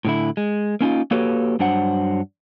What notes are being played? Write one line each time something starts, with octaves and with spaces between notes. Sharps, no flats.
A2 D3 E4
G#3
A#3 C#4 D#4 F4
A#3 F#4 G4 A4 B4 C#5
G2 F#3 D4 C5 F#5